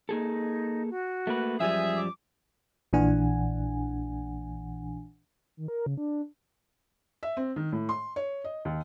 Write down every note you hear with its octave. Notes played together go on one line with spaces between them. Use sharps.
A#3 D#4 G#4 A4
F#4
A3 A#3 B4
F#2 F3 G3 G#4 E5 G#5
D6
A#1 A#2 E3 D4 F#5 G#5
D#3
A#4
C#3
D4
E5
C4
D#3
A2
C6
C#5
D#5
D#2